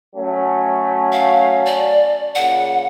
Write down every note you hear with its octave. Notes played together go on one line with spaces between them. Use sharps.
F#3 A3 C#4
F5
D5
A#2 C#3 F#5